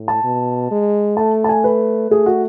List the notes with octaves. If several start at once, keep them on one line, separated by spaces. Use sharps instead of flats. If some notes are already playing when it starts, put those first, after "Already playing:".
Already playing: A2
A5
B2
G#3
A3 A5
A5
G#5
B4
A3 G#4
F#4